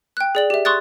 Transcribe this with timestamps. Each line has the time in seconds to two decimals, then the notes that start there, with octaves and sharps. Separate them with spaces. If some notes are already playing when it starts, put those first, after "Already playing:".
0.17 G5 F#6
0.35 G#4 D5 F#7
0.50 G4 E5
0.65 C6 C#6 D#6 F#6 A6